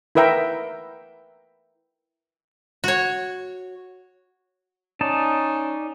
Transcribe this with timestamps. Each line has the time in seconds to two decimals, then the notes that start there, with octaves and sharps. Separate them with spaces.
0.15 E4 A#4 B4 E5 G5 A#5
2.84 F#4 C#5
5.01 C#4 D#4 D5 A5